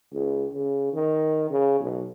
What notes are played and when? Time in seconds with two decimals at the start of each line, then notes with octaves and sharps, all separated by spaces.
0.13 C#2
0.52 C#3
0.93 D#3
1.50 C#3
1.80 B1